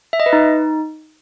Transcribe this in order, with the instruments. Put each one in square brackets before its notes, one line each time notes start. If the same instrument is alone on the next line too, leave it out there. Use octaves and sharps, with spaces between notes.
[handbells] E5
D#5
B4
D#4